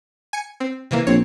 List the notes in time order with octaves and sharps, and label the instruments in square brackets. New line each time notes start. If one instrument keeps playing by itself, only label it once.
[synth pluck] G#5 C#7
C4
C3 E3 A#3
[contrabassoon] A#1 [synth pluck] C4 C#5